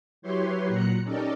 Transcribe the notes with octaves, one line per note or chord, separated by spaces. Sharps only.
F#3 E4 G4 B4 C#5 C6
A#2 F#3 A#5 F#6 C#7
C#4 D#4 G4 A4 A#4 D5